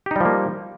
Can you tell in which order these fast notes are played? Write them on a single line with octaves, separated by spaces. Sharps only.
G4 D#4 G3 F3 A#3